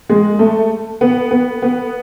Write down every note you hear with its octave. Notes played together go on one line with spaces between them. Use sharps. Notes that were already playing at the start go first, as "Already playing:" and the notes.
G#3
A3
B3
B3
B3